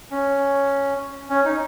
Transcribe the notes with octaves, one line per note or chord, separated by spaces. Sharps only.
C#4
C#4
D#4